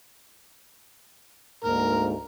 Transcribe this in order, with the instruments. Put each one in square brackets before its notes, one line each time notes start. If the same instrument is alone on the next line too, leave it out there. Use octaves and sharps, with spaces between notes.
[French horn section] D2 G#2 A#3 [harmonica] A#4